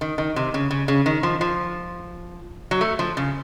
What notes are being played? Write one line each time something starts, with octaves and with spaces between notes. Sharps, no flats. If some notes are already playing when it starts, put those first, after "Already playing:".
D#3
D#3
C3
C#3
C#3
C#3
D#3
F3
F3
F#3
A3
F3
C#3